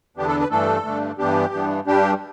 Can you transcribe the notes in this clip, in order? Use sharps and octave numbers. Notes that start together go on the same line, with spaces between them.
E2 D3 B3 D4 G4
A4
B4
G2 E3 A3 D4 A4
G2 D3 A3 D4
G2 E3 B3 D4 G4
G2 E3 B3 D4
G2 G3 D4 G4